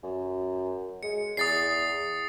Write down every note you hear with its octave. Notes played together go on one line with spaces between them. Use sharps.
F#2
G#3 C#7
E2 D#6 A6 C7